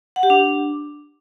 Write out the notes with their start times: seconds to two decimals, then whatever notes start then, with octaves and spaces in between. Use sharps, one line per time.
0.16 F#5
0.23 G4
0.30 D4